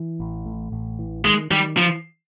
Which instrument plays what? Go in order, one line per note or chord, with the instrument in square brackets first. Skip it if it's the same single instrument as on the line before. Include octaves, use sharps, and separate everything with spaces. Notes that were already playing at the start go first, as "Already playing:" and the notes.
Already playing: [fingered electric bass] E3
A1
A2
A1
E3
[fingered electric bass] D#3 [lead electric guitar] G#3
[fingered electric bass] D#3 [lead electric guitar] G3
[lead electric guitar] F3